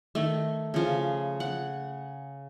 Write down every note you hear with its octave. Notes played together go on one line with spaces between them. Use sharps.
D#3 A3
C#3 F3
F#5